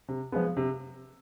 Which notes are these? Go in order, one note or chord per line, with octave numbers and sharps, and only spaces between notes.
C3
F3 G#3 B3
C3